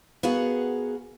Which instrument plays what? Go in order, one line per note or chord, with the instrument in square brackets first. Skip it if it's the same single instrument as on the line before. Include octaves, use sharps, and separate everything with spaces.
[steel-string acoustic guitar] B3 F#4 G#4 A#4 F5 F#5